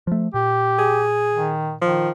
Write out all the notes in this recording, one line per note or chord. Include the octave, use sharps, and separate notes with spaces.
F3 A3
A#2 G4
G#4
D#3
D#3 F3